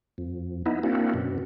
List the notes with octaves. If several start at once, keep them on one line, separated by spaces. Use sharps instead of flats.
F2
B3 D#4 E4
A#3 C4 D4 E4 F#4
F#2 B2